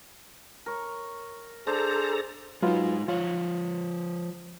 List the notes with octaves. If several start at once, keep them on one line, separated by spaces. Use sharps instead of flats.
A#4 C#5
D4 G#4 A4 C5 A#5
F#3 G#3 D#4 F4 B4
F3 F4 C#5